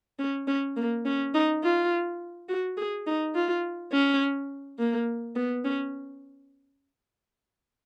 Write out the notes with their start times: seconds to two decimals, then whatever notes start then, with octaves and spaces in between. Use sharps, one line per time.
0.19 C#4
0.47 C#4
0.77 A#3
1.05 C#4
1.34 D#4
1.63 F4
2.48 F#4
2.77 G#4
3.06 D#4
3.35 F4
3.92 C#4
4.79 A#3
5.36 B3
5.65 C#4